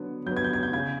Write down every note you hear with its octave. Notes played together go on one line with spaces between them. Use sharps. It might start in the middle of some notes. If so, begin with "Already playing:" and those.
Already playing: D3 F#3 B3
F#3 B3 G6
G#6
G6
G#6
G6
C#3 G#6